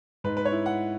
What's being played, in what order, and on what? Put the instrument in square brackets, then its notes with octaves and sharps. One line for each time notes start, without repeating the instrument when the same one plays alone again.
[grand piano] G#2 [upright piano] B4
[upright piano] B4
C#5
[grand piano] E4
[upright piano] F#5